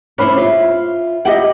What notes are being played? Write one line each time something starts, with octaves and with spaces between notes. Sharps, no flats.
C#4 D4 E4 C5 C#5 B5
F4 E5
E4 G4 D#5 F#5 G5